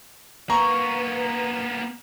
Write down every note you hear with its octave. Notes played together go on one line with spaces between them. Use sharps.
A#3 B3 B4 A#5 C#6